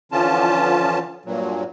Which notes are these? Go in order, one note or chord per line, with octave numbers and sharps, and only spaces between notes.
D3 E3 F3 C#4 F4 A5
G2 A#2 F#3